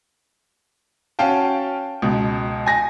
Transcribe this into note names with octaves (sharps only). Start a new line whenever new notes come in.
C#4 F#4 F5 G5 A5
C#2 B2
G#5 A#6